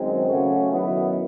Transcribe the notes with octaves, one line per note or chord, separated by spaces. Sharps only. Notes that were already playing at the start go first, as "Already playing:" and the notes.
Already playing: F#2 D#3 G#3 C4 D#4
C#3 F#3 A3 C#4 F#4
F#2 D#3 F#3 B3 E4